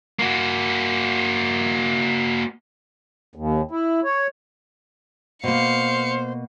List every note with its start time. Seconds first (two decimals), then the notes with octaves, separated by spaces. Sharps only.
0.19 A#3 F#4
3.35 D#2
3.71 E4
4.04 C#5
5.43 B2 A#3 C5 F5 C#7